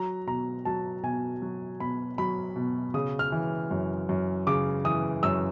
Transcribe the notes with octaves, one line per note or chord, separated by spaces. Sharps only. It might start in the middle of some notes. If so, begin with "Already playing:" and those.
Already playing: F#3 A#5
B2 A#5
F#3 A5
B2 G#5
F#3
B2 B5
F#3 B5
B2
C#3 D#6
F6
E3
F#2
F#2
C#3 D6
E3 D#6
F#2 E6